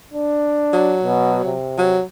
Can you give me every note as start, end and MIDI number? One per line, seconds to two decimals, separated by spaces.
0.14 0.97 62
0.73 1.54 54
1.04 1.42 47
1.45 1.99 48
1.78 2.01 54